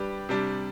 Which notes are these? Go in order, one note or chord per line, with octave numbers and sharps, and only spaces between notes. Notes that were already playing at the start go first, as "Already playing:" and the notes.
Already playing: G3 D4 G4 B4
C3 G3 D4